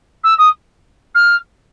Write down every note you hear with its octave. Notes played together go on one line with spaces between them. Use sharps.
E6
D#6
F6